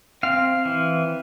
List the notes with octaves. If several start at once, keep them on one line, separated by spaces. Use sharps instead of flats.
C4 F5
E3